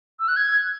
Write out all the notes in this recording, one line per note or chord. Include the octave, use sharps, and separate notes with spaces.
E6
F#6
G#6